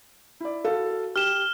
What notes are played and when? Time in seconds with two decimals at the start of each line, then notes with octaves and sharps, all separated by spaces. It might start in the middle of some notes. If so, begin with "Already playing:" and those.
0.40 E4 D5
0.64 F#4 A4 F5
1.16 G4 F6 E7 G7